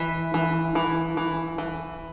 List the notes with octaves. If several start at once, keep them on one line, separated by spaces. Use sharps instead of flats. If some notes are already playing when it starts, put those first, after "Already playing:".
Already playing: E3 E5
E3
E3
E3
E3